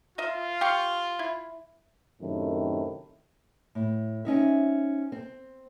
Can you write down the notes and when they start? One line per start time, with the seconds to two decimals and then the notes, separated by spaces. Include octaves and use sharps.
0.18 F4 A#4 D#5 E5
0.61 G4 F5 C#6
1.19 E4
2.21 F#2 A2 C3 D#3
3.75 A2
4.25 C4 C#4 D#4 E5
5.12 C4